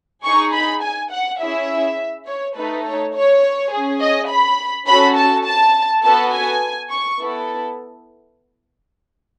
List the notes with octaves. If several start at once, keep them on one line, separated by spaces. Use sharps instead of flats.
D#4 G#4 C#6
B5
G#5
F#5
C#4 E4 G#4 E5
C#5
A3 D#4 A4 B4
C#5
C#5
C#4 G#4
D#5
B5
C#4 F#4 A4 B5
A5
A5
B3 F#4 A4 A5
G#5
C#6
B3 E4 A4